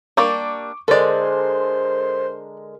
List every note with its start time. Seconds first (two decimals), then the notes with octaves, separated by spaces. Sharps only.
0.17 G3 A#3 D4 C#6 D6
0.88 D3 G#3 A4 A#4 C5 D5